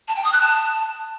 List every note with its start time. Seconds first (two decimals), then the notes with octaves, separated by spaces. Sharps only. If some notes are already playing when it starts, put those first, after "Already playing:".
0.08 A5
0.16 G5
0.25 D#6
0.33 F#6
0.41 A5